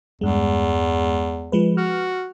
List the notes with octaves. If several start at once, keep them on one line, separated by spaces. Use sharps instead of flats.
E2 G2 G#3
F3 G#3 B4
F#4 F6